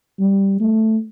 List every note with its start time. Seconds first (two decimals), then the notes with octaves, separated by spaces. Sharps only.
0.20 G3
0.60 A3